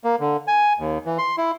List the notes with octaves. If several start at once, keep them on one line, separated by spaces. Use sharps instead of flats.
A#3
D3
G#5
D#2
E3
C6
E4